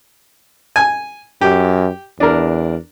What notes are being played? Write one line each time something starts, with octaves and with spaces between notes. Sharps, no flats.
G#5
F#2 G4
E2 D4 A#4